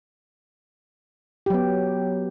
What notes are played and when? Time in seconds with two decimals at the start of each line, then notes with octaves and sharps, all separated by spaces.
1.46 G4
1.50 F#3
1.54 B3